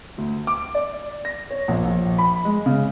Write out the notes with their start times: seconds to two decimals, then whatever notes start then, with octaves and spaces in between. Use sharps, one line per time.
0.18 D2
0.47 D6
0.75 D5
1.25 A#6
1.51 C#5
1.68 A#1
1.85 A#1
2.18 B5
2.45 G#3
2.66 C#3